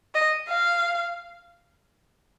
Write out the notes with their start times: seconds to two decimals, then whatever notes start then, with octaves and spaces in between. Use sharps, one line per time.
0.14 D#5
0.48 F5